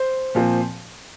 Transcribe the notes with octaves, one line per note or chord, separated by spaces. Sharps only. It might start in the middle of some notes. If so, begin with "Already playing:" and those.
Already playing: C5
A#2 F3 C4